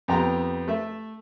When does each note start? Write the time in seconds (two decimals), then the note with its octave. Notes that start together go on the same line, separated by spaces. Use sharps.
0.08 F2 B3 G4 G5 A#5
0.68 A3 E5